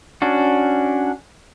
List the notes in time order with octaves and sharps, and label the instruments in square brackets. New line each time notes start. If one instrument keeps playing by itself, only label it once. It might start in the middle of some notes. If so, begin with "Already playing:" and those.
[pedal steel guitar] C#4 D4 F#4